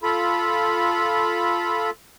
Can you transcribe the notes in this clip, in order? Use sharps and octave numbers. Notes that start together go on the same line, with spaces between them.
F4 A4 B5